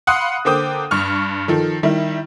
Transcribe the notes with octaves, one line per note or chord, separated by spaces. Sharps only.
F5 F#5 B5 C6 D#6 F#6
D3 A#3 C5 G5 D6 D#6
G2 C#6 F6
D#3 F3 A4
D#3 G3 E4